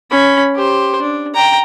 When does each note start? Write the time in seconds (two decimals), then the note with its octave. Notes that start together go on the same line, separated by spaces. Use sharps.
0.11 C#4 B5
0.55 G4 C5
1.01 D4
1.34 G5 A#5